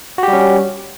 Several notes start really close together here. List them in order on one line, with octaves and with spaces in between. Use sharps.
F#4 G4 G3 C#4